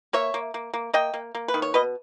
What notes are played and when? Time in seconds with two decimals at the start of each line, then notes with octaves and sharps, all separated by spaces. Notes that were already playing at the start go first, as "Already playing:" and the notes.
0.13 A#3 C#5 E5
0.34 A#3
0.54 A#3
0.74 A#3
0.94 A#3 D#5 G5
1.14 A#3
1.35 A#3
1.48 B4
1.54 D#3
1.62 C#5
1.74 B2 B4 D#5